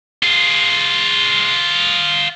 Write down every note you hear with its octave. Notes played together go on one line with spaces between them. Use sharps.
F4 G#4